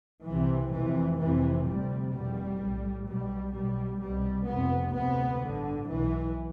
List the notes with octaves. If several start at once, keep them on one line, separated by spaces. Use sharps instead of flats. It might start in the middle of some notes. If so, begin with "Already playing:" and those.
C2 C3 E3
F1 F2 C3 E3
F1 F2 C3 E3
D2 C3 G3
F1 E2 B2 G3
B1 A2
B1 B2 G3
B1 B2 G3
C2 B2 G3
F1 F2 C3 B3
D2 C3 B3
A1 G2 D3
B1 B2 E3